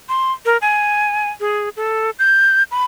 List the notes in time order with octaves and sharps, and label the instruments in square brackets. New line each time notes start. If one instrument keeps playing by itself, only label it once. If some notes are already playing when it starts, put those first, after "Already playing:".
[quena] C6
A#4
G#5
G#4
A4
G6
B5